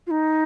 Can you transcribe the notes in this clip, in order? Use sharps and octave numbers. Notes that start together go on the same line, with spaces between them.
F4
D#4